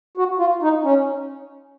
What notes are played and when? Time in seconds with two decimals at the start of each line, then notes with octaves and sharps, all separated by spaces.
0.17 F#4
0.39 F4
0.62 D#4
0.84 C#4